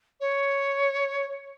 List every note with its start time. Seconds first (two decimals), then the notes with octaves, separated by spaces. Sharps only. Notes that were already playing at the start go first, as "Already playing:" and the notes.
0.20 C#5